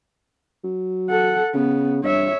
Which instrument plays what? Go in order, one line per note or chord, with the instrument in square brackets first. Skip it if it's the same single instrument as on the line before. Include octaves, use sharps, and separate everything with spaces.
[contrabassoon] F#3
[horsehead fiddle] A4 F#5
[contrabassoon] C#3 [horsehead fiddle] B3
[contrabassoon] G2 [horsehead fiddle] C#5 E5